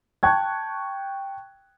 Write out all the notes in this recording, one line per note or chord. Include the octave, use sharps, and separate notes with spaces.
G5 A5 C#6 F#6 G#6